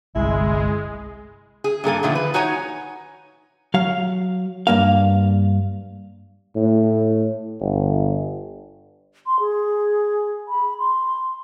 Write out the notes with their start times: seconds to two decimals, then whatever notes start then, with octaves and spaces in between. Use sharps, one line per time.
0.15 G1 C2 G#3 E4
1.64 G#4
1.84 G2 A#3 A4 G#5
2.03 A#2 D3 D#3 F3 A3
2.15 B4
2.34 D#4 F#4 C#5 G#5 A#5
3.74 F#3 F5
4.67 G2 A#3 F5
6.56 A2
7.60 G1
9.26 C6
9.40 G#4
10.49 B5
10.79 C6